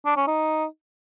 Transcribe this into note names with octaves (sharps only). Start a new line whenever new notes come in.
D4
C#4
D#4